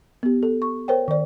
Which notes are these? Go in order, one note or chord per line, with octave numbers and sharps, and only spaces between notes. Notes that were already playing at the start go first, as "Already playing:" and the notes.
B3 G4
A4
C#6
A#4 C5 C#5 G5
D#3 D5